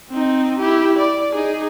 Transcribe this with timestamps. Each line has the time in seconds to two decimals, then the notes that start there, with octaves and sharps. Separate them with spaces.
0.11 C4 D#4
0.59 E4 G4
0.98 D5
1.35 D#4 G#4